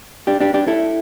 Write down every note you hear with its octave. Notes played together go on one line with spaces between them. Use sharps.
D4 G4
D4 G4
D4 G4
E4 A4